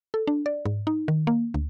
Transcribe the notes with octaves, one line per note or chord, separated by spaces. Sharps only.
A4
D4
D5
G#2
D#4
D#3
A#3
D2